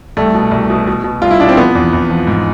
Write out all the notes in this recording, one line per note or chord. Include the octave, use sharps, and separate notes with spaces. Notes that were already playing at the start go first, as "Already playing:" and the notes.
C2 A3
B2
C2
B2
B2
B2
C2 F4
E4
B2 D4
C4
F3 B3
E2
E2
F3
G#2